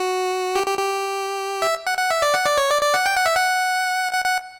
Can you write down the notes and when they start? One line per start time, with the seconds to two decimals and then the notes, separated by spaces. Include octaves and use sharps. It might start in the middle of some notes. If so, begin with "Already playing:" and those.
Already playing: F#4
0.56 G4
0.67 G4
0.79 G4
1.62 E5
1.87 F#5
1.98 F#5
2.10 E5
2.22 D5
2.34 F#5
2.46 D5
2.57 C#5
2.71 D5
2.83 D5
2.94 F#5
3.06 G5
3.16 F#5
3.26 E5
3.36 F#5
4.13 F#5
4.25 F#5